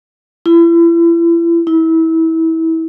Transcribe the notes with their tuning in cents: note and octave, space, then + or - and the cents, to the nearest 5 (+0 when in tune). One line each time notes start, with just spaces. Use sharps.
E4 +35
E4 -25